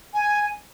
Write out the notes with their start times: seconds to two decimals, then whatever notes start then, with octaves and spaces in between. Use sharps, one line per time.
0.13 G#5